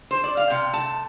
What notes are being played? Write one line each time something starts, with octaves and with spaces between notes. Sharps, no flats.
C5
D5
F5
C3 G5
A3 A5